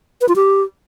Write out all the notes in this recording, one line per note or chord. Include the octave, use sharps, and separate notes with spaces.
B4
F4
G4